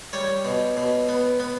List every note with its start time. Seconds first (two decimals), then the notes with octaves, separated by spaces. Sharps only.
0.13 G3 C#5
0.45 B2
0.77 B2
1.09 B3
1.40 B3